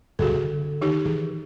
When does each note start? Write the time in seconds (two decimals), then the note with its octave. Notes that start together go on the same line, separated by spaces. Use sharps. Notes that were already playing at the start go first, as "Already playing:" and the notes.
0.19 F#1 C2 A2 F#4 G#4 A4
0.44 D3
0.81 D#3 D#4 G4
1.05 D#3 E3 G#4